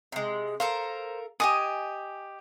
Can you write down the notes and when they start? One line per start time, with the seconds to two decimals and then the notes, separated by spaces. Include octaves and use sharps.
0.12 C3 G#3
0.60 A4 A#4 C5 F5
1.40 G4 D#5 G#5 D#6